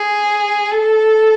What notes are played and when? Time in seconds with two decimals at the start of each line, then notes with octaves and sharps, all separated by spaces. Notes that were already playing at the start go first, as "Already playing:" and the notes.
Already playing: G#4
0.72 A4